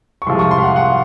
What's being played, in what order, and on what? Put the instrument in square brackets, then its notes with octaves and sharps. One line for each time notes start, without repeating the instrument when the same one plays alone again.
[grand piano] C#6
C2 C3 F3 G#3 C6
C#6
C6
F5
F#5
F#5